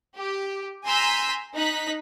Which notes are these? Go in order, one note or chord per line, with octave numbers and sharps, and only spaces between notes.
G4
G#5 A#5 C6 E6 G6 B6
D#4 F#6 B6